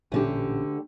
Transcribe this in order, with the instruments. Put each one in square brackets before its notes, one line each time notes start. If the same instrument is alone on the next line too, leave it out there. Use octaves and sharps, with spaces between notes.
[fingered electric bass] A1 A#2 C#4 [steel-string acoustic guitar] D2 D3 G4